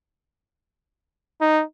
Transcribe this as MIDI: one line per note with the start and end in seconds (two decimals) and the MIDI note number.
1.41 1.62 63